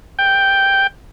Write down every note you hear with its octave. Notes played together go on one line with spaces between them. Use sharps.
G5